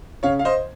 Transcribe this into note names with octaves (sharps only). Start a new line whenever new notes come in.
C#3 C#5 F5
F5
C5 D#5